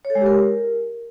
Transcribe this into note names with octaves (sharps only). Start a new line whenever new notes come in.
C#5
A4
G#3
G4
A#4